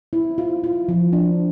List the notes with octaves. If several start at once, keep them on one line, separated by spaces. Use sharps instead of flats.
E4
F4
F4
F3
D4